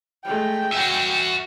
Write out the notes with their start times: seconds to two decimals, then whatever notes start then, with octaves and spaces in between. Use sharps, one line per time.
0.25 G#3 A3 G5
0.72 F#4 E5 G#5